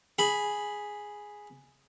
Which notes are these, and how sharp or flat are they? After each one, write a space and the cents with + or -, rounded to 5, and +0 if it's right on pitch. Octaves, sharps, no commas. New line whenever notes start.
G#4 +0 B5 +0